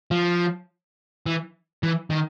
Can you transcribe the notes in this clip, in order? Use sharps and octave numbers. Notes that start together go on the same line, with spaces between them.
F3
E3
E3
D#3